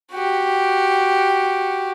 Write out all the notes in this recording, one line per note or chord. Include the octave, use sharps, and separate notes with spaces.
F#4 G4